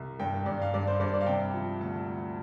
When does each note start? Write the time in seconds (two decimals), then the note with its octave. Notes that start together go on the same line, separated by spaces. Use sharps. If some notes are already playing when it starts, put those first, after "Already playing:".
Already playing: C2
0.19 G2 G5
0.46 G2 D5
0.62 F5
0.74 G2 D5
0.87 C5
1.00 G2 D5
1.14 D5
1.21 F5
1.26 C3 G5
1.54 F3
1.81 D2 A5
2.08 D2